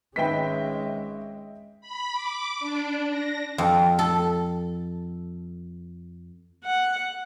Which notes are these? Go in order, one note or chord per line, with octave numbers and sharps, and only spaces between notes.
G#1 G#3 C#4 B4 D#5 E5 G5 B6
B5
D6
D4
A#6
F2
A4
F#5